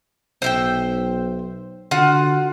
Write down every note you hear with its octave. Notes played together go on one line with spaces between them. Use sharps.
B1 C5 E5 G5
D3 F4 F#4 F#5